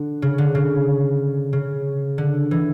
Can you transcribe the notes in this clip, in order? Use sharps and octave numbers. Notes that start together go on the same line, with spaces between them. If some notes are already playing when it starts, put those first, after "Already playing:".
Already playing: D3
C#3
D3
C#3
C#3
D3
E3